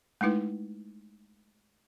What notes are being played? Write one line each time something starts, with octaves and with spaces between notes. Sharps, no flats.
G#3 A3 D#4 E4 B4